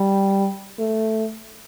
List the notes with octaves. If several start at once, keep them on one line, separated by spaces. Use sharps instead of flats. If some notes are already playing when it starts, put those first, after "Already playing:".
Already playing: G3
A3